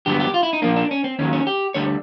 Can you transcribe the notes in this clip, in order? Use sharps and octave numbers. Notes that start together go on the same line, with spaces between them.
G2 D3 F#3 B3 G4
G4
F4
E4
D#4
A#2 F3 A#3 D4
D4
C#4
C4
D#2 D#3 F#3 C#4
C#4
G4
D2 D3 G3 C#5